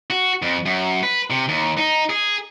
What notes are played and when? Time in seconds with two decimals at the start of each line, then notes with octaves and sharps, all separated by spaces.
0.10 F#4
0.42 F2
0.66 F#2
1.03 B4
1.30 C3
1.48 D#2
1.78 D#4
2.10 G#4